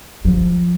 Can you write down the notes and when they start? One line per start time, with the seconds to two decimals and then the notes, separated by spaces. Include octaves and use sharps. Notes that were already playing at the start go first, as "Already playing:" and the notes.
0.25 F3